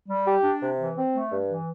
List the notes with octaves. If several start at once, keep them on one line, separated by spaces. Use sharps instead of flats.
G3
G4
D4
C3
E3
C4
A3
G2
E3